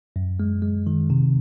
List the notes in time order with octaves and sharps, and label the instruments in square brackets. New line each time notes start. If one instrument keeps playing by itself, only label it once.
[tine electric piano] F#2
G#3
G#3
D#3
C3